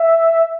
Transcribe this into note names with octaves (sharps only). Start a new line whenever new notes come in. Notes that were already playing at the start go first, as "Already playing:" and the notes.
Already playing: E5